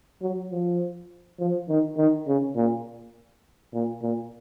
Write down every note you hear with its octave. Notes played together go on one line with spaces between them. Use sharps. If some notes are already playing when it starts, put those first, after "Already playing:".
F#3
F3
F3
D#3
D#3
C#3
A#2
A#2
A#2